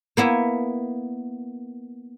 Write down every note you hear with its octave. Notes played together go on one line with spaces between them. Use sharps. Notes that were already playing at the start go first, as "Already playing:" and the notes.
A#3 B3 E4 E5